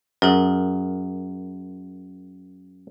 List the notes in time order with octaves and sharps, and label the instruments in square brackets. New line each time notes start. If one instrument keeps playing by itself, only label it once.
[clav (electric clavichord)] F#2 [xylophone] G#4 A#4